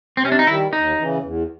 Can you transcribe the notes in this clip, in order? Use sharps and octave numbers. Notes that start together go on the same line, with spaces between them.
C4
C3 C#4
D4
D#4
D#3 G3 E4
D#2 D#4
C#3 E3
E2